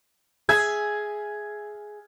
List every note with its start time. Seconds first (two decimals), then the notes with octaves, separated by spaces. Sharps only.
0.49 G#4 E5 G#6